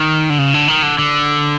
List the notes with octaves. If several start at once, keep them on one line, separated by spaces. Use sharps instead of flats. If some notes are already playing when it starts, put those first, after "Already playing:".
Already playing: D#3
D3
C#3
D3
D#3
D3
D3